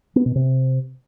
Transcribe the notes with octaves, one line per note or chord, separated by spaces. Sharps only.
B3
B2
C3